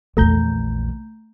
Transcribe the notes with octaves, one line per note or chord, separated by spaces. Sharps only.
A#1 E2 A3 A#5 G6